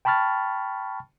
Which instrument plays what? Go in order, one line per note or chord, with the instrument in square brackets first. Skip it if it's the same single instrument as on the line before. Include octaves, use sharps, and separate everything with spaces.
[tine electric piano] G5 A5 B5 C#6 F6 A6